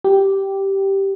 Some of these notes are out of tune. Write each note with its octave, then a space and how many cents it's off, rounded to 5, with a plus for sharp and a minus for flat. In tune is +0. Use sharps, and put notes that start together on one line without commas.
G4 -5